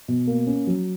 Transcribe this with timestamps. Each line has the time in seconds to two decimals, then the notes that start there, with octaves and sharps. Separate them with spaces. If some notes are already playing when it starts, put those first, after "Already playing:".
0.08 B2
0.27 A#3
0.47 C#4
0.67 F#3